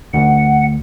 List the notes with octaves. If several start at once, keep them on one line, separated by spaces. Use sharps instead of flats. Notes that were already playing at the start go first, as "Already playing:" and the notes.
D2 F#5